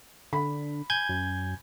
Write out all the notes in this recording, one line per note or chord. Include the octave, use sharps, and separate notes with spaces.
D3 B5
G#5 G6 G#6
F#2